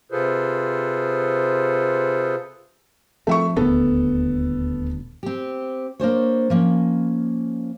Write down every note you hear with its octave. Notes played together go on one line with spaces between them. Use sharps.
C3 F4 G#4 A4 B4 C5
F3 A3 C4 E5 C#6
D#1 D2 B3 A4
C4 G4
A#3 D4 C5 C#5
F3 A#3 C#4